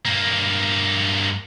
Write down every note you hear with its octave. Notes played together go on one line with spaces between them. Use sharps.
G2 A#3